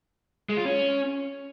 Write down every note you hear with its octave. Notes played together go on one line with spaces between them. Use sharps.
G#3
F4
C#4